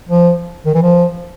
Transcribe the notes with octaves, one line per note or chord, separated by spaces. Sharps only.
F3
D#3
E3
F3